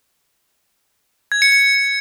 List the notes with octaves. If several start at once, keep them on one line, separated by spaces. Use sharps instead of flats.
G#6
C#7
C#7